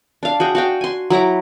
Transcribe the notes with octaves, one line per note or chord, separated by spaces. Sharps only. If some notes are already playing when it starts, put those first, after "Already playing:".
D4 F5
F#4 G#4 G5
F#4 F5 G5
G#5 C6
F#3 E4 A#5 D6